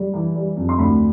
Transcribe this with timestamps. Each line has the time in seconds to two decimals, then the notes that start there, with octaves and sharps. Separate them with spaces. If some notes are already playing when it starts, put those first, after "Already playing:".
Already playing: G3
0.14 E3
0.35 G3
0.57 F2
0.69 C6
0.78 D2 B5